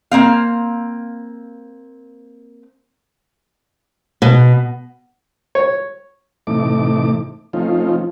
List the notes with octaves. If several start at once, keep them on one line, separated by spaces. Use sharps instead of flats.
A#3 C4 F5
B2
C#5
A2 C3 E3 A3 D#4 D6
F3 A3 C4 C#4 D#4 F4